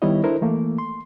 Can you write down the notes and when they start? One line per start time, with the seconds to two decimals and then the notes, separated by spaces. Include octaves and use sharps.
0.02 D#3 G3 B3 E4 C#5 D#5
0.24 D4 E4 A4 A#4 C5
0.42 E3 A3 A#3
0.78 C6